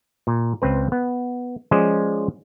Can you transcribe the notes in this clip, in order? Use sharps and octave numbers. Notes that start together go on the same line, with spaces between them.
A#2
C#2 C4 B4
B3
F3 G#3 C#4 C5 D5 D#5